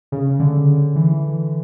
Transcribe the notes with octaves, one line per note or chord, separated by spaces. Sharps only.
C#3
D3
E3